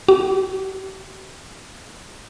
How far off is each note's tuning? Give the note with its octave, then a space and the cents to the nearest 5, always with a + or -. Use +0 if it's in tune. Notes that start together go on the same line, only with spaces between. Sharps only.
G4 -40